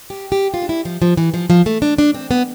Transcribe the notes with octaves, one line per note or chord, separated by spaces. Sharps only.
G4
G4
F4
D4
E4
F3
F3
E3
F3
F3
A3
D4
D4
C4
B3